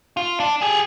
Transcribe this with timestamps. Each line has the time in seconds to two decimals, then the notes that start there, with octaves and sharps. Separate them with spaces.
0.17 F4
0.40 D4
0.61 G4 G#4